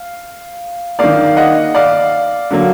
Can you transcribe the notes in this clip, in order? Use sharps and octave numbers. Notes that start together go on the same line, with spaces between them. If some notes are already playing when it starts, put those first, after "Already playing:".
Already playing: F5
D#3 A#3 D5 F5
D#5 F#5
D5 F5
D3 F#3 A#3